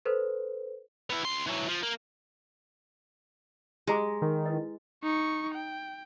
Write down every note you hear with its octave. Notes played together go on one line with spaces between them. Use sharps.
A4 B4 C5
B3 E4
D2 C6
E3 F#3
F3
A#3
G#3 G4 A#5 D6
D#3
E4 B4 D#5
D#4 C#6
G5